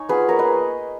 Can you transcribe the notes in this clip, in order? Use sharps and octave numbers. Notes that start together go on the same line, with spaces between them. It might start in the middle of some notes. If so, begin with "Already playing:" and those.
Already playing: D#4 C#5 G#5
B3 F4 G#4 B4
A#3 A#4 C#5
B4 D#5